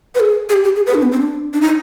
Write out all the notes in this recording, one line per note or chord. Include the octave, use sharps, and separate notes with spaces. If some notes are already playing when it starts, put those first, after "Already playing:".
B4
G#4
G#4
G4
G4
G#4
B4
D4
B3
C4
D4
D4
D#4